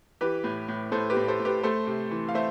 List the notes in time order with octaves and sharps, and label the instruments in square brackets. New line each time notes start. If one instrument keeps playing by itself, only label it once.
[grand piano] E3 G4 B4
A2
A2
A2 A4 C5
G4 B4
A2
A4 C5
A2
G4 B4
A3 A4 C5
C3
E3
F5
A3 C5 E5